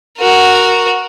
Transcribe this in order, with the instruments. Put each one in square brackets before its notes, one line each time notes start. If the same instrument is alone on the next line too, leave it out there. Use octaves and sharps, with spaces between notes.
[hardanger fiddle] F#4 A#4